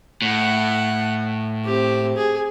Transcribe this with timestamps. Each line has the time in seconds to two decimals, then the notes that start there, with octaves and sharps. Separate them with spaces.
0.22 A2 F#5
1.65 C4 G4
2.17 G#4